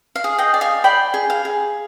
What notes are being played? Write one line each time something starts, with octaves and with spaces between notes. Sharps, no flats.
F5
G#4
D#5 G5
D5
F5 G#5
D5 G5 B5
G#4
F5
G#4